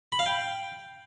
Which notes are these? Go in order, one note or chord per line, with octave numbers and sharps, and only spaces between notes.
B5
F5
G5